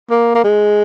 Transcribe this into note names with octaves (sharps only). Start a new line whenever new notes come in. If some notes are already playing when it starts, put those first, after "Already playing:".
A#3
A#3
G#3